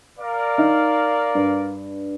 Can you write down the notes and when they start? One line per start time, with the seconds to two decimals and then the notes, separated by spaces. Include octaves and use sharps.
0.19 A#4 D5 F5
0.58 D#4
1.35 G2